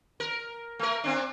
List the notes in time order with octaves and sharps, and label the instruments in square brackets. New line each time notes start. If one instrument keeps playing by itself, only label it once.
[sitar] A#4
A3 A#4
A#3 C4 D4